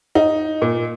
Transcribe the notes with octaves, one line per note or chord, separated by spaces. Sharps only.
D#4
A#2